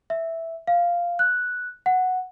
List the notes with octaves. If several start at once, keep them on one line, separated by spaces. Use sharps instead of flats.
E5
F5
F#6
F#5